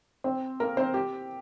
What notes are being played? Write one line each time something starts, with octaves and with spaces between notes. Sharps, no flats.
C4 C5
A#3 A#4
C4 C5
G4